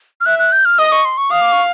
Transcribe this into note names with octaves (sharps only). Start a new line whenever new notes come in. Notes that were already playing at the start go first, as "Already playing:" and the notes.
F6
E5 F#6
F#6
G6
F6
D#5 D#6
C#6
C6
C#6
F5 D#6
D6
C#6